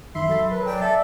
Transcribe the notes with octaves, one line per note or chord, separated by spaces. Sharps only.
F#2 D#3 E5 B5 C6 C7
F#3 A4 A6
F#3 A#4 B4
D5 G5 G#5
A4 E5 A5